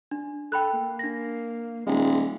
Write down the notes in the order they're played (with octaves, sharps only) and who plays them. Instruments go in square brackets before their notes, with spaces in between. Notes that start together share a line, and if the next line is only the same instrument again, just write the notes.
[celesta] D4
[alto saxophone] A4 [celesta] G5 B5 F#6
[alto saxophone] A#3
[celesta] D4 A#6
[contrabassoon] D#1 [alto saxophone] G#3